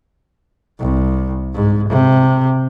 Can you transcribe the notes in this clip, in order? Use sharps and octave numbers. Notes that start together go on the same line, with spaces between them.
C2
G#2
C3